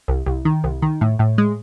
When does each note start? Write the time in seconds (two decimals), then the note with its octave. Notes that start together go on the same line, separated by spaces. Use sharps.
0.08 C2
0.26 C2
0.45 D#3
0.64 C2
0.82 D#3
1.01 A2
1.19 A2
1.38 G#3